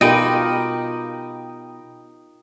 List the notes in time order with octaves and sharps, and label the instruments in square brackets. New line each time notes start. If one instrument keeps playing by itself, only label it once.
[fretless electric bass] B2 [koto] D#4 [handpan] F4 G4 A#4 [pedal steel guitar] D#5 G5 B5